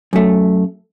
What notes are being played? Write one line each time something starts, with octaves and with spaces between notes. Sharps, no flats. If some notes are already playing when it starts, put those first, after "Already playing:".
F#2 A3